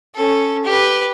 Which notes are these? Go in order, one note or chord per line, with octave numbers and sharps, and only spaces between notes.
C#4 A4
G4 B4